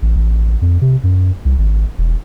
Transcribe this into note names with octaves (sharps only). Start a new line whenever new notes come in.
A1
A1
F2
C3
F#2
C2
G#1
E1